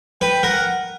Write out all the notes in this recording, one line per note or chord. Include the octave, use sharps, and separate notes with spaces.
B4 G5
A#4 F#5